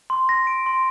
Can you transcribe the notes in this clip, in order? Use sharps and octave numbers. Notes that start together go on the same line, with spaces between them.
C6
A#6
D7
C6